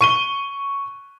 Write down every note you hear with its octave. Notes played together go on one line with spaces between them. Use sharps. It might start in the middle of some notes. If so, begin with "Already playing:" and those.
C#6 D#7 G7